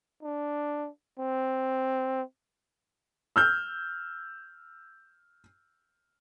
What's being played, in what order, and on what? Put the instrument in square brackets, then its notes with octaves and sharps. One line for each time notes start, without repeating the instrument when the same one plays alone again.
[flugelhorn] D4
C4
[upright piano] E6 F6 G6